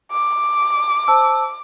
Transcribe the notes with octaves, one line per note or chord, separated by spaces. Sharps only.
D6
C5 A5 E6